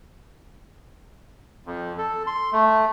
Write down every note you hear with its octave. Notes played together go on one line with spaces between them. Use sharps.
F2
A4
C6
A3